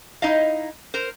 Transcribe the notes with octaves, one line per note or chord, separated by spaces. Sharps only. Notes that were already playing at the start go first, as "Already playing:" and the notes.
D#4 E4 D#5 F5
A#4 C5